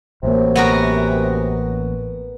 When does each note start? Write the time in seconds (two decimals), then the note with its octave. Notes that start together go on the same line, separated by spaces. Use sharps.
0.23 A1 F#2 C3 A#3
0.56 B3 F#4 A#4